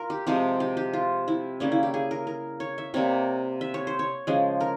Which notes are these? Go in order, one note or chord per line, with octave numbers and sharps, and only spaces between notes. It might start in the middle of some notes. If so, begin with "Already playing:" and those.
Already playing: F4 A#4
G4
C3 F3 G#3 G4
G4
G4
F4
E4
C#3 G3 A#3 C#4
E4
G4
G#4
A#4
A#4
C#5
E5
C3 G3 A#3 C#5
E5
C#5
C5
C#5
C#3 F3 G#3
A#4